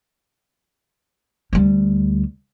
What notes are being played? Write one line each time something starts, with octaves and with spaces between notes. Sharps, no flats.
D2 G3